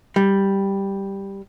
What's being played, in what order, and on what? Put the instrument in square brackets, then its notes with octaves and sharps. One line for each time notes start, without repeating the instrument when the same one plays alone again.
[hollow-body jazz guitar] G3